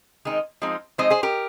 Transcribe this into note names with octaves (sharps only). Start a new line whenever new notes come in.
D#3 G#3 C4 D#4
F3 G#3 C4 D#4
F3 G#3 C4 D#4 C5 D#5
G#4 C5
G4 A#4